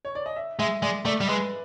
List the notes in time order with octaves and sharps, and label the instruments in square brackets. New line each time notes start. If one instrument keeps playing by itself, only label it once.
[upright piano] C#5
D5
D#5
E5
[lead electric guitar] G#3 [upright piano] E5
[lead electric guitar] G#3 [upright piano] D5
[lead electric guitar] A3 [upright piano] D5
[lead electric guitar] G3
[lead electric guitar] G#3 [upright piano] B4